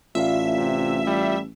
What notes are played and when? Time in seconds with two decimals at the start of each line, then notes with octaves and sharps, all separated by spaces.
0.15 A1 A2 F4 D5 E5 F5
0.57 C3
1.07 G3